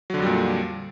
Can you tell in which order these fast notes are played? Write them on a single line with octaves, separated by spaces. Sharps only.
F#3 D3 F2 G3 A#2